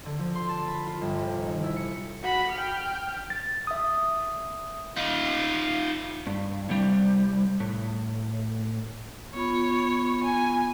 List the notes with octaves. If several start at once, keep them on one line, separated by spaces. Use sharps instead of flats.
D3
F3
C6
A5
B5
F4
G1
C3
D#3
E4
C#7
F#4 B5
G5 F6
A6
E5 D#6
D#4 F4
G2
C2 G3
A2
B3 F4 C#5 B5
G#5